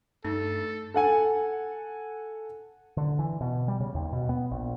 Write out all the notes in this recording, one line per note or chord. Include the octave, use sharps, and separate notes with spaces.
G2 A3 D#4 A4
A4 F#5 G#5
D3
E3
B2
G3
C#3
D#2
B2
B3
A#1